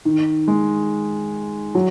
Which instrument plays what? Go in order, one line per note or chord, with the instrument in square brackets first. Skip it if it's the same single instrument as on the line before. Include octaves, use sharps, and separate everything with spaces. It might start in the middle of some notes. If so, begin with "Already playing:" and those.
[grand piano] D#3
G#3
F#3